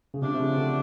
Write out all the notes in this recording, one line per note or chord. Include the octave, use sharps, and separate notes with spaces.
C#3
C3 F3 A3 D4
C3
C#3
D3